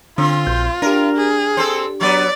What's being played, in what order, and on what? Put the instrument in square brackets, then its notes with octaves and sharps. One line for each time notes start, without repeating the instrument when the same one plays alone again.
[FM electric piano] D3 [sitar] C4 [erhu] F4
[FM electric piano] A#1 G6
[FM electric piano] D4 G4 [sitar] A#4
[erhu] G#4
[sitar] C4 A4 C5
[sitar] F#3 B3 [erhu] D5